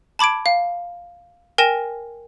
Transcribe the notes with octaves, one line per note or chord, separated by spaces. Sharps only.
A5 B5 D6 G#6 D7
F5
A#4 G5 G#5 A#6 E7